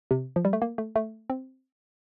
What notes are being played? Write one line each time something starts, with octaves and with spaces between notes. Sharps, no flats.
C3
F3
G3
A3
A#3
A3
A3
C4